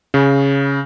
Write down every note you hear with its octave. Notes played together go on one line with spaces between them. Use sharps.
C#3